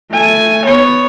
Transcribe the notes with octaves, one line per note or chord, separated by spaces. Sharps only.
A3 G#5
B3 C#5